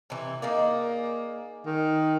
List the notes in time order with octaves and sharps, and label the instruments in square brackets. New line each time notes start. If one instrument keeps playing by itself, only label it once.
[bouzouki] C3 E3
[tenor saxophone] A#3 [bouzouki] D#4 G#4 D5
[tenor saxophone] D#3